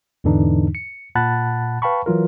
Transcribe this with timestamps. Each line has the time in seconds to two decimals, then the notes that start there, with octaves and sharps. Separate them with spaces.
0.24 E2 G#2 D3 E3 D4 D#4
0.75 C#7
1.15 A#2 F#5 A5 B5 F#6 A6
1.82 B4 F5 G5 A5 B5 C#6
2.06 E3 F#3 F4 A#4